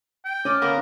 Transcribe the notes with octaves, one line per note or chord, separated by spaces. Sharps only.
G5
C#4 D5 D#5 D6 F6
D3 A#3 B3 A#4